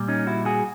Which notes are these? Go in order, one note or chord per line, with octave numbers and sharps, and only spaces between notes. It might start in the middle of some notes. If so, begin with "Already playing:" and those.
Already playing: A#2 G3
C#4 D#4
E4 F#4
F#4 G#4